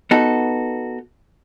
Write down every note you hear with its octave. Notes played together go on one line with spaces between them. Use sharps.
B3 D#4 F#4 A4